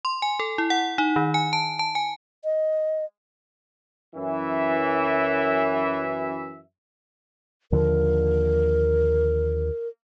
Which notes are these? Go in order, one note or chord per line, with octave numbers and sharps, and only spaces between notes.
C6
G#5
A4
E4
F#5
D#4
D#3
G#5
A5
A5
G#5
D#5
F#2 E3 E5
D#2 D3 F3 A#4